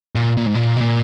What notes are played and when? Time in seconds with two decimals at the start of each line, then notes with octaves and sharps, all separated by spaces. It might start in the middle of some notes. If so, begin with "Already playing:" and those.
0.15 A#2
0.37 A#2
0.46 G#2
0.55 A#2
0.76 B2
0.80 A#2